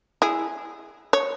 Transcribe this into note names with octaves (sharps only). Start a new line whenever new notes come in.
E4 G#4
C#5